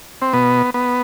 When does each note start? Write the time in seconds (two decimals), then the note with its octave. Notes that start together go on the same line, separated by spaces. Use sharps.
0.22 C4
0.34 B2 B3
0.74 B3